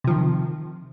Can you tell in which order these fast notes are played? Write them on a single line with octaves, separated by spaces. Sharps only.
C3 F3 D#3